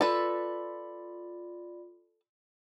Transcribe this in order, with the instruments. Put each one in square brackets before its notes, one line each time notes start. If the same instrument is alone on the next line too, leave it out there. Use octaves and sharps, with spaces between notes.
[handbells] F4 D5 B5 [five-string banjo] A4 B4